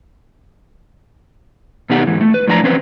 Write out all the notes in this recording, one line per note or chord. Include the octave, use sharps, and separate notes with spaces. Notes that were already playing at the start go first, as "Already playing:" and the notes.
B2 D#3 B3 D#4 G4 F#5
G#2 E3
A3
B4
A2 F3 D4 F#5 A#5
E3 C4 C#4 B4 C5